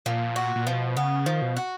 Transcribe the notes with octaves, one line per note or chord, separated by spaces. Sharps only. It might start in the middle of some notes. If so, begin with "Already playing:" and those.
A#2 F3
F#4
A#2
B2 F3
C#3 B3
D#3 F3
B2
F#4